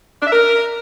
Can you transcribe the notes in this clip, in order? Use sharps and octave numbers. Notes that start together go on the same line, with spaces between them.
D4
E5
A#4